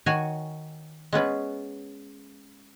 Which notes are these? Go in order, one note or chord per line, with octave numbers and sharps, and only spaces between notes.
D#3 F#4 C#5 G#5
G#3 B3 C#4 B4